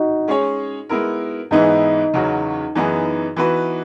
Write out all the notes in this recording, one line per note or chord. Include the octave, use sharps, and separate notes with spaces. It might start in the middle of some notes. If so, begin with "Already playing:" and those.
Already playing: D#4 F#4
G#3 C#4 G#4 C#5
G#3 B3 E4 A#4
G#2 E3 B3 D#4 E4 G#4
E2 C#3 F#3 C#4 F#4
F#2 E3 B3 D#4 G#4
E3 B3 F#4 B4